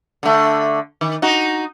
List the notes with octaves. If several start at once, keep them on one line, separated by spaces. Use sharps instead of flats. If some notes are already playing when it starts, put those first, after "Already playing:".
D3 A3
D#3
D#4 F#4